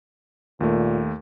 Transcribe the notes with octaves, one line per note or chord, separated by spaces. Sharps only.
D#2 A#2 A3